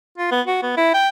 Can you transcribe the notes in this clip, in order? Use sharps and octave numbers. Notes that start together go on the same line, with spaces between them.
F4
B3
F#4
B3
E4
G5